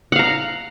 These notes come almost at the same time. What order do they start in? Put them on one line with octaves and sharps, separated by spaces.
F#5 F5 A#5